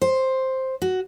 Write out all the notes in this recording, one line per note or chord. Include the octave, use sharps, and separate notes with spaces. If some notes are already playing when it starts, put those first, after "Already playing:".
C5
F#4